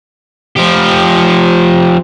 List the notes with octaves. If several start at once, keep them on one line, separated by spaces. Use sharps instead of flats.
F3 G4